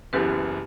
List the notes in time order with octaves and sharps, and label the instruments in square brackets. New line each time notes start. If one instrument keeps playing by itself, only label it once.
[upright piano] F#1 F#2 E3 B3 [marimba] G4 B4